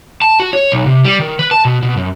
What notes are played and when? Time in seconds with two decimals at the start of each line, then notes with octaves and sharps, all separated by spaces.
0.22 A5
0.40 F#4
0.53 C#5
0.72 B1
0.86 C3
1.04 G3
1.19 D#3
1.39 B4
1.51 A5
1.65 B2
1.83 B2
1.97 F#2